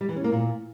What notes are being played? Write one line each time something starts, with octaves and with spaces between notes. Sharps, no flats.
G3
E3
C#4
A#3
A#2